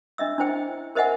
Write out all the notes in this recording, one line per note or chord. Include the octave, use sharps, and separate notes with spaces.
D4 D#5 E5 E6
D4 E4 C5 G5
A#4 C5 D#5 E5 F#5 G#5